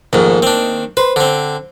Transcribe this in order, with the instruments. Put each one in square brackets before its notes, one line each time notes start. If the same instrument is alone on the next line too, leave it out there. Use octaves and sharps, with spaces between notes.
[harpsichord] F2 G#2 [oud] D#3 A#3
[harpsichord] C4 D4
[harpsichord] B4 [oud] C5
[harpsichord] D3 C4